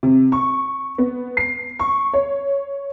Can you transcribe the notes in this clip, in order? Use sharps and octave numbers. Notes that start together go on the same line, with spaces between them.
C3
C#6
B3
C7
C#6
C#5